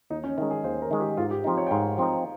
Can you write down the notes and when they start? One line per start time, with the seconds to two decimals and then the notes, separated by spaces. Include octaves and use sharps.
0.10 D#2 D#4
0.24 C#4
0.38 D#3 G#3 C#4
0.51 G#4
0.64 D#2 C5
0.82 A#4
0.91 D#3 G#3
1.00 G4
1.17 G#2 F4
1.31 G4
1.44 F3 C4 D#4
1.58 C#5
1.67 G5
1.71 G#2 F5
1.98 F3 C4 D#4